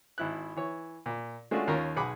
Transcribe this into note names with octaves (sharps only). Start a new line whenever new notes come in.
G#1 E4 F#6
E3 C#5
A#2
G#3 A3 C#4 D4 F4 F#4
D#2 C#4 F4 A#4 A#5
B1 G#4 F#5 B5 D6